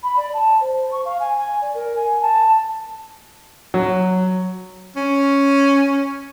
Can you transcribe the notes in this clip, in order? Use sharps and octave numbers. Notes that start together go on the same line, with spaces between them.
B5
D5
A5
C5
C#6
F5
G#5
G#5
D5
A#4
G#5
A5
F#3
C#4